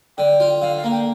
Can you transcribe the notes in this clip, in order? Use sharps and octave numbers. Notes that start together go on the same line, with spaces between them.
D3 G5
F4
D3 F5
F5
A#3
G5